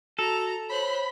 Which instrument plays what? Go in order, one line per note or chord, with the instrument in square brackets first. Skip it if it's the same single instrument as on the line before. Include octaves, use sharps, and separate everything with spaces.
[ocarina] F#4 [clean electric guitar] A4 [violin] A#5
[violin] C5 F#6 [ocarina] C#5 [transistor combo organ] B5